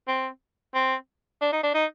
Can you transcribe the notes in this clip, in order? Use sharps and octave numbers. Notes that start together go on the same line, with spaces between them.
C4
C4
D4
D#4
D4
D#4